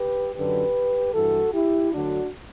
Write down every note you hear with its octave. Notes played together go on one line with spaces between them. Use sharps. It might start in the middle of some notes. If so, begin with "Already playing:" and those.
Already playing: G4 B4
F#2 D3 F#3 G4 B4
G2 E3 F#4 A4
E4 G4
D2 D3 F#3 D4 F#4